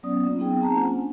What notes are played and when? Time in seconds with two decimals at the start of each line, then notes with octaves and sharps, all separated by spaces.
0.03 F#3 B3 C#4 D5 D#6
0.25 A#3 C4 C#4 F4
0.38 F#3 B3 C4 D#4 G#4 G5
0.61 C4 A5 A#5
0.75 A#3 C#4 F4 C5 F#5 G#5
0.94 D4